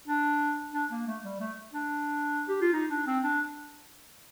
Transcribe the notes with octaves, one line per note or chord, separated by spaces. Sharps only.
D4
D4
A#3
A3
G3
A3
D4
G4
F4
D#4
D4
C4
D4